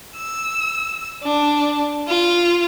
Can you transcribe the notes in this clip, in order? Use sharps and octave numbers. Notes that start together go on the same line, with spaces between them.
E6
D4
F4